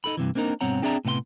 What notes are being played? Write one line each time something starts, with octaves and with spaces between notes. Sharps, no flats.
D#4 A4 B5
G2 C3 E3
A#3 C4 D4 D#4 A#4
G2 B2 C4 C#5 F#5 A#5
C4 D4 G#4 D5 E5 A#5
A2 C3 B3 F5 C6